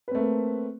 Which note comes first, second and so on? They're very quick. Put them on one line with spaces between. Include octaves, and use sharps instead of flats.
B4 C4 A3 A#3